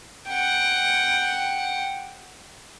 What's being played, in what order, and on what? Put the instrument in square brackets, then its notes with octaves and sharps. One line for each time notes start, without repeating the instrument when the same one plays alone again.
[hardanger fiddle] F#5 G5